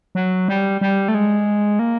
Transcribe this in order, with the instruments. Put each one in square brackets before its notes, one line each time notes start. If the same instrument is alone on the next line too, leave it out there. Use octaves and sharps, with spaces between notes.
[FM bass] F#3
G3
G3
A3
G#3
A#3